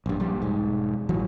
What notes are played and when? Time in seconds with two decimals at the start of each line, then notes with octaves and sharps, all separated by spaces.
0.06 A#1 G2
0.20 A#1 G3
0.42 E1 G#2
1.09 A1 E3 F#3